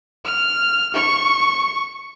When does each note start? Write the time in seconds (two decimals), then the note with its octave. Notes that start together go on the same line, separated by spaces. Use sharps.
0.25 F6
0.94 C#6